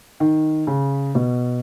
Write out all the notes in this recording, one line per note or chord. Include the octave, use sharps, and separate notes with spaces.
D#3
C#3
B2